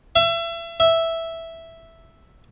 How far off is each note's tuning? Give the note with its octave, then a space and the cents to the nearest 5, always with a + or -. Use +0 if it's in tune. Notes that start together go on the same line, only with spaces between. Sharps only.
E5 +30
E5 -5